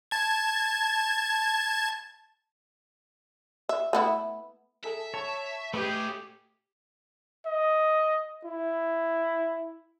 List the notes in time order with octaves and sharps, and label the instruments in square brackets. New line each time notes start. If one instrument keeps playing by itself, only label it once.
[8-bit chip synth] A5 G#6
[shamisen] E5
A3 B3 E4
[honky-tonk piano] G#4 A4 [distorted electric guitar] E5
[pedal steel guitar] C#5 [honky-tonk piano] A5 C#6
[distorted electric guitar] A2 G#4 [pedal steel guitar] A3 D#5 G5 [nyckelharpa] G4 [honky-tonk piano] B4
[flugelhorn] D#5
E4